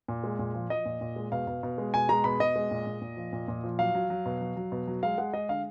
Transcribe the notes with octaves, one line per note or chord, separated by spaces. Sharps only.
A#2
G#3
A#2
F3
F3 D#5
A#2
A#2
G#3
B2 F5
B2
B2
G#3
B2 G#5
G#3 A#5
B2 B5
B2 D#5
G#3
A#2
A#2
A#2
F3
A#2
A#2
F3
F#3 F5
F#3
F#3
B2
F#3
F#3
B2
F#3
G#3 F5
G#3 F#5
G#3 D#5
D3 F5